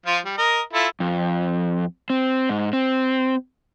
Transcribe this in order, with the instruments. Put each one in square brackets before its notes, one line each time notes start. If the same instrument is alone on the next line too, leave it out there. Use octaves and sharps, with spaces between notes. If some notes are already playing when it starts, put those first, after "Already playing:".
[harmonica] F3 F4
G3
A#4 D#5
E4 F4 A4
[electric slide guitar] F2
C4
G#2
C4